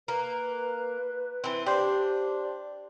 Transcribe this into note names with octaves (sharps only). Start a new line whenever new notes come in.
A#3 B4
E3 C4
D4 G4 C5